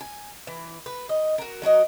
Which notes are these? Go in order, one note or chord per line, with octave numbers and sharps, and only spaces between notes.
G#5
E3
B4
D#5
F#4 A#4
F#3 F#4 A#4 D#5